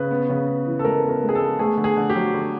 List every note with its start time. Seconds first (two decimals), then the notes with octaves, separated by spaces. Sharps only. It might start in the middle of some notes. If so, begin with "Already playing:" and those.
Already playing: C#3 B4
0.11 B3
0.29 C#3
0.47 B3
0.67 E3
0.79 A4
0.85 G#3 A#4
1.03 B3
1.09 A#4
1.23 G#3
1.29 G#4
1.35 A4
1.41 B3
1.59 A3 G#4
1.77 D3
1.84 G#4
1.97 D3
2.10 G4
2.15 F#3
2.34 D3